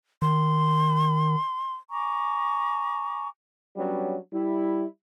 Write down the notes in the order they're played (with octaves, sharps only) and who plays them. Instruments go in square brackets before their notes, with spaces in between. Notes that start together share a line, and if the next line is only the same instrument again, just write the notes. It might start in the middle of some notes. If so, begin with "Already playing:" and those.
[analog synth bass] D#3 [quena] C6
[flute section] G#5 A#5 C#6 D6
[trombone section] F#3 G3 B3 C#4 D4
G3 E4